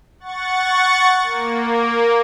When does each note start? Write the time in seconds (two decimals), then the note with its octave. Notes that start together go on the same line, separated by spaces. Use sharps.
0.20 F#5 C#6 A6
1.23 A#3